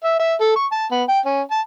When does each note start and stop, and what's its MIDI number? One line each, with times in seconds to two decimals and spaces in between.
0.04 0.15 76
0.19 0.34 76
0.40 0.55 69
0.56 0.66 85
0.72 0.85 81
0.91 1.03 59
1.09 1.19 79
1.25 1.41 61
1.51 1.60 81